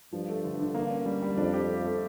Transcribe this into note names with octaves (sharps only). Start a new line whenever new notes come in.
G2 F3
A3
D3
D3
A#3
C#4
G3
G3
F2 D4
G4
A3
A3